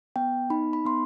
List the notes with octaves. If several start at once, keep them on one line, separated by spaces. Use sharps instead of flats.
B3 G5
D#4 B5
B5
B3 C6